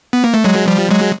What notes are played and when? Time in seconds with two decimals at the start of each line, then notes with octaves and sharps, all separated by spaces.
0.13 B3
0.24 A#3
0.34 A3
0.44 F#3 G#3
0.67 F3 G3
0.91 F#3 G#3